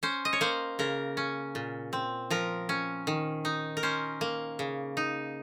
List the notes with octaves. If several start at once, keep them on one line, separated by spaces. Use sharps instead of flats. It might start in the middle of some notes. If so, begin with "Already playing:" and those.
C#4 C5
D#5
C#5
A#3 C5
C#3 A#4
C#4
A#2
C4
F3 A#4
C#4
D#3
D#4
A#4
C#4 C5
A#3
C#3
D#4